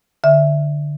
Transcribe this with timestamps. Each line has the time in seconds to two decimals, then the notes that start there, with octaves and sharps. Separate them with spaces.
0.24 D3 E5